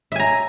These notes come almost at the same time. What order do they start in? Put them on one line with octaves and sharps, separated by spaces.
E5 G#5 A#5